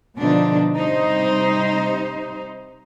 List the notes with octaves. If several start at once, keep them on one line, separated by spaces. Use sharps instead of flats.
B2 D3 F3 D4 D#4
C3 G3 D#4 C5